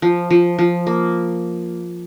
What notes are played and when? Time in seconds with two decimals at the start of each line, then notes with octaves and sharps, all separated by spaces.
0.02 F3
0.30 F3
0.59 F3
0.87 A#3